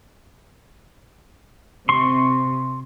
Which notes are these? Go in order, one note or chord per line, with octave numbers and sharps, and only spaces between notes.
C3 C6 C#6